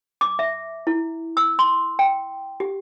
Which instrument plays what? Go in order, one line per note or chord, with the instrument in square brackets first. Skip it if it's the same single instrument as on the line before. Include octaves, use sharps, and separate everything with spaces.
[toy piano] D6
E5
E4
E6
C6
G5
G4